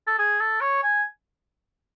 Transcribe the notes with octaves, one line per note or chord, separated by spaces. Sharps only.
A4
G#4
A4
C#5
G#5